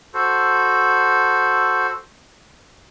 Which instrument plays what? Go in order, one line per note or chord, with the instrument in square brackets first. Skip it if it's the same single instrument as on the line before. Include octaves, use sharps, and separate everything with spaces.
[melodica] F#4 A4 C5